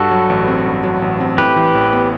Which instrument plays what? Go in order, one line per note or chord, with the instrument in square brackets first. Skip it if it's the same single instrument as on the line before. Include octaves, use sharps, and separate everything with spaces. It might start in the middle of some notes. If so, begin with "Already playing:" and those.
Already playing: [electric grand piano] G2 [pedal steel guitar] F#4 A4
[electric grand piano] F#3
A1
C4
G2
F#3
A1
C4
[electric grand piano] A2 [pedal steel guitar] G4 B4
[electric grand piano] E3
A1
B3